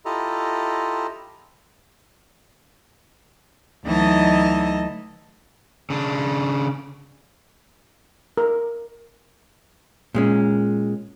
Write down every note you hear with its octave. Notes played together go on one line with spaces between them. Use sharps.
E4 F4 G4 A4 D#5 A#5
D2 E3 F#3 D#4 D#5 A5
C#3 D4
A#4
A#2 G#3 C#4